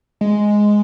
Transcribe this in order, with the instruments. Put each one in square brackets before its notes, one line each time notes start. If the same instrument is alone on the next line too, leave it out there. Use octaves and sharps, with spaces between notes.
[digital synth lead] G#3